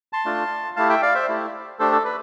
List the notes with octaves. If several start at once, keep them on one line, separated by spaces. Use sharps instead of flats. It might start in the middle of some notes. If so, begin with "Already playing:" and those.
A5 C6
A3 D4 F4
A3 E4 G4 F5 A5
E5 G5
D5 F5
C5 E5
A3 E4 G4
A3 D4 G4 A4 C5
A4
B4